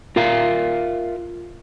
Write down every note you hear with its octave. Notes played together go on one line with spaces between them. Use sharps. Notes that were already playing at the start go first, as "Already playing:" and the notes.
F4 A#4 E5 F5